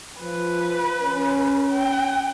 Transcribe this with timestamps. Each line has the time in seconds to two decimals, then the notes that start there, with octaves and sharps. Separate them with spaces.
0.20 F3 B4
1.01 C#4
1.70 G5